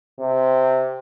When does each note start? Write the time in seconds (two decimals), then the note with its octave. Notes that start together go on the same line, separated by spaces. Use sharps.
0.19 C3